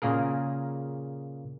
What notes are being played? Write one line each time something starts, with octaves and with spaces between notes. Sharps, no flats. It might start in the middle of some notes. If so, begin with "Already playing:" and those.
A#2 C#3 A#3 G#4 A#4